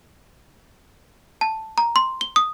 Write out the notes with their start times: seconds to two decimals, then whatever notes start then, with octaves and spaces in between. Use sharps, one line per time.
1.41 A5
1.78 A#5
1.96 C6
2.21 G7
2.36 D#6